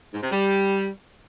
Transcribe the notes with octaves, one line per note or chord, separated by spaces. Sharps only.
G#2
C3
G3